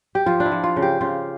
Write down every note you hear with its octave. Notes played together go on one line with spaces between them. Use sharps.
G4
F3 F4
D4
E4
F3
F4
C#3
G4
C#3 F4